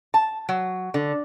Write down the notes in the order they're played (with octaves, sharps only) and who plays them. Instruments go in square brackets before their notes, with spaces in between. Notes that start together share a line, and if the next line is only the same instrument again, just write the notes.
[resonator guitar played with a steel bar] A5
F#3
D3